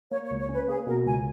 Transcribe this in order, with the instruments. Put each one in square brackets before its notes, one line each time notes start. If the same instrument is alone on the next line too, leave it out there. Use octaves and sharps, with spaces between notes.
[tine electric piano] A#3 [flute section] C#5
[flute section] C#5
[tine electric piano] C#2
[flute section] C#5
[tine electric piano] C#4 [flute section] B4
[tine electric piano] A#3 [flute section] G#4
[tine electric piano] B2 [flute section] A#4
[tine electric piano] C#2 [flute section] G#5